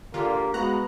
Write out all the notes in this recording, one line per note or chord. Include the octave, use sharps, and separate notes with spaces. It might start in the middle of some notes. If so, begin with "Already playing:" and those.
D3 A#3 F4 G4
G#3 B3 F#4 F5 A#5 C#6 F#6